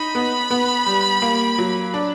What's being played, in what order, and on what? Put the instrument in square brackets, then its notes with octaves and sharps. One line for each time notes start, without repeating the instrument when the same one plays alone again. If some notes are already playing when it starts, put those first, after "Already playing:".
Already playing: [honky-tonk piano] D#4 [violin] B5
[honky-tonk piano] B3
B3
G3
A#3
F#3
D4